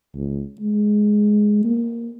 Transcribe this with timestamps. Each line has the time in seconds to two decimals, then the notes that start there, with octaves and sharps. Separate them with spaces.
0.15 C#2
0.61 G#3
1.64 A#3